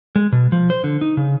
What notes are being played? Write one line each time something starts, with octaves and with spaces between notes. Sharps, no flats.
G#3
B2
F3
C5
D3
D#4
C#3